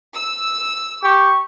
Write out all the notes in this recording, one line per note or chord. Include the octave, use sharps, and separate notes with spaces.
E6
G4 C#6